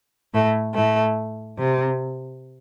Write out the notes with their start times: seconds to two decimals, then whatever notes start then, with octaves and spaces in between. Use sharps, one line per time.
0.34 A2 A3
0.75 A2 A3
1.57 C3